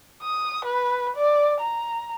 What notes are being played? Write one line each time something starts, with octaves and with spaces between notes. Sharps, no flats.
D#6
B4
D5
A#5